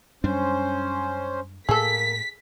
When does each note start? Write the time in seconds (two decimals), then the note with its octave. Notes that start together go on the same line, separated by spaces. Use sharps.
0.24 F#2 G3 C#4 D4 C5
1.69 A2 A#3 G#4 A4 B6